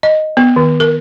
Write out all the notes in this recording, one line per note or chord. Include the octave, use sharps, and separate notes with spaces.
D#5
B3
D#3
A#4